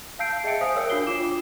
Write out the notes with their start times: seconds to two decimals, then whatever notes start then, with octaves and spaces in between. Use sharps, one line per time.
0.19 F5 A5 E6 G6 C7 D7
0.44 G#4 D#5 E5 G5 C#7 D7
0.61 C5 F5 G#5 D#6
0.76 A#4 C#5 G5 E6
0.90 D4 F#4 C7 G7
1.07 F4 D6 E7